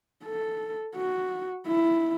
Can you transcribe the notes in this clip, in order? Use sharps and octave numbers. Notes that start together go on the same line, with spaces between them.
A4
F#4
E4